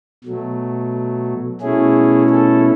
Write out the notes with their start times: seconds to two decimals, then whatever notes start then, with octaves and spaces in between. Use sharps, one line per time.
0.24 B2 F#3 A3
1.61 B2 A3 C#4 E4 G#4
2.29 A4